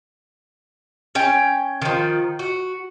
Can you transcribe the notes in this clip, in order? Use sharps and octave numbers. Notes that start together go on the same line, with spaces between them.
C#4 G5
D#3 F3
F#4